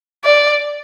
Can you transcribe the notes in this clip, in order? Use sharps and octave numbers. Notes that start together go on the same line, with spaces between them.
D5